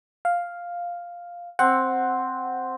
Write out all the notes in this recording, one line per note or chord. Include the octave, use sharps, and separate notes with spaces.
F5
C4 F#5